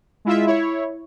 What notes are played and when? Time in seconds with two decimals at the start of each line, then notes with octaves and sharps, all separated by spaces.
0.25 G#3 E4 F4 E5
0.47 E4 C#5